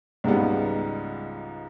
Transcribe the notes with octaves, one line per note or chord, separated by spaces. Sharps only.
C#2 G#2 G3 B3